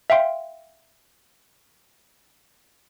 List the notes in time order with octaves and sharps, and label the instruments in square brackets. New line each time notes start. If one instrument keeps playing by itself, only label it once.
[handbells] E5 F5 G5 C6